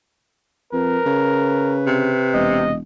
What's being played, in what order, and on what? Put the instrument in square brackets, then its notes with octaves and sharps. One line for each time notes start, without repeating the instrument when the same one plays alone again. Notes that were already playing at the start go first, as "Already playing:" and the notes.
[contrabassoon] F2 [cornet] A#4 [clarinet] B4
[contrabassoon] C#3
[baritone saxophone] C3
[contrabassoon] E1 [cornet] D#5